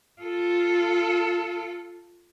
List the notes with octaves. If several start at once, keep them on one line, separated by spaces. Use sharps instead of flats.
F4 A4